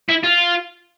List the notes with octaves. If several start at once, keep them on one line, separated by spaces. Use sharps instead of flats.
E4
F4